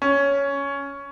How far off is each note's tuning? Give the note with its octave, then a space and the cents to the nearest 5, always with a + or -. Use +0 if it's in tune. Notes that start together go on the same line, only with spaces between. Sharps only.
C#4 +10